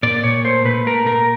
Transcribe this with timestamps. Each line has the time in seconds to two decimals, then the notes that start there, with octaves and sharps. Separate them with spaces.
0.03 A#2 D5
0.24 A#2 C#5
0.44 A3 C5
0.66 A#2 B4
0.86 A3 A#4
1.07 A#2 A#4